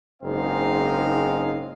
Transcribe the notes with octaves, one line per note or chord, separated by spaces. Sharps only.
F#1 G#2 G#3 C4 D#4 F5